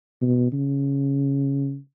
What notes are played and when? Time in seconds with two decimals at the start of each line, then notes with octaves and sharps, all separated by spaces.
0.22 B2
0.53 C#3